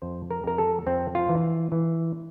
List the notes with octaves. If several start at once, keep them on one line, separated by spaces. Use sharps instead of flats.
F2 C5
A#4
F2 A#4
A4
F2 C4
F4
E3
E3